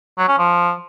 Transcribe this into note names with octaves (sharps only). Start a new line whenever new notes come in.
F#3
C#4
F3